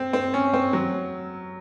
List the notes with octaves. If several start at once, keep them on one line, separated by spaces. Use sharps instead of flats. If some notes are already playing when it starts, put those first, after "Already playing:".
Already playing: C4
C4
C#4
C4
F#3